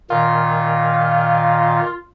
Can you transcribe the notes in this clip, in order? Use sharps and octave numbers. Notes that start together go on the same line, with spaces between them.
A#2 D#3 F4